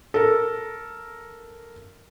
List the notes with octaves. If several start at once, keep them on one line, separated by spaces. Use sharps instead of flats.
A4 A#4